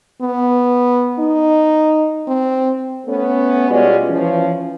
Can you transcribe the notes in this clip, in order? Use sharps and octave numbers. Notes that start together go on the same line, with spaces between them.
B3
D#4
C4
A3 B3 C#4
B2 G3 G#3 C#4 F4 D5
E3 F3 C#4